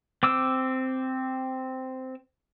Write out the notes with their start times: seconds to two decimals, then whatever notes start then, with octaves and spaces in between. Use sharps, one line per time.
0.23 C4 D6 E6